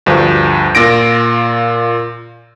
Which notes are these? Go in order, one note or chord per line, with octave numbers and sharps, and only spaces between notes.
D2 G2 F3
A#2 F4 A#6 D7